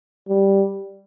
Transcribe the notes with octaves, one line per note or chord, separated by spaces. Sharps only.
G3